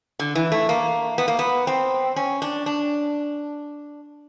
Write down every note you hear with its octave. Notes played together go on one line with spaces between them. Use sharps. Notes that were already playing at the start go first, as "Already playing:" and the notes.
D3
E3
A3
A#3
B3
A#3
B3
C4
C#4
D4
D4